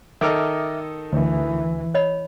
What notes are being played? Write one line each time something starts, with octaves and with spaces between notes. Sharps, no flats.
D#3 A4 D#5 E5 D6 F6
D2 E3
C#5 D#5 B5